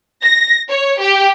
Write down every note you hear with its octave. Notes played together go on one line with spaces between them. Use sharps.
A#6
C#5
G4